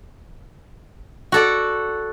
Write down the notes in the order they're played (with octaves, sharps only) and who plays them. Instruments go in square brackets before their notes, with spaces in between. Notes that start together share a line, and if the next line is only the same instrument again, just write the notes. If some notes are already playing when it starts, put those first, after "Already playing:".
[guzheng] F#4 A4 D5